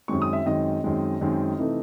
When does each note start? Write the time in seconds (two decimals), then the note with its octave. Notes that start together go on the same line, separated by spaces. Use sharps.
0.08 F#2 D#3 G#3 C4 C#6
0.22 D#6
0.33 E5
0.46 F#2 D#3 G#3 C4 D#5
0.84 F#2 D#3 G#3 C4
1.21 F#2 D#3 G#3 C4
1.59 C3 E3 A3 D#4